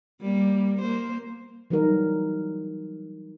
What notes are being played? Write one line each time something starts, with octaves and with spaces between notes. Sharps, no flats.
G3 A#3
A#3 C5
E3 F#3 G3 D#4 A#4